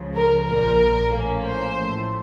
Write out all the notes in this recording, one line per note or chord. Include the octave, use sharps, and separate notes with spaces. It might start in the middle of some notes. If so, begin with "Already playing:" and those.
Already playing: C#2 C#3 F3
A#4
A#1 A#2 F3 A#4
A2 F3 A#3 C#4
C5
A1 A2 F3 A3